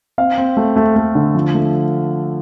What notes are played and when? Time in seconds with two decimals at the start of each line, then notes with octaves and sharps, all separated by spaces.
0.18 C4 F5
0.38 C4
0.57 A3
0.76 A3
0.96 A3
1.15 D3
1.35 F3
1.54 A3